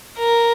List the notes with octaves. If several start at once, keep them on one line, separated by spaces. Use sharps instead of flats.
A#4